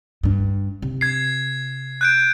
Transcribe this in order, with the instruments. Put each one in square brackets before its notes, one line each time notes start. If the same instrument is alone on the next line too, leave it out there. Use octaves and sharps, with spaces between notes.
[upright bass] G2 D4
C3
[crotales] G#6 C7
F#6 G6 D7